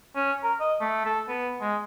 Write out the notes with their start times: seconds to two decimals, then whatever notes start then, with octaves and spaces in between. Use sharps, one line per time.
0.15 C#4
0.43 A#4
0.60 D#5
0.80 A3
1.05 A4
1.28 B3
1.61 G#3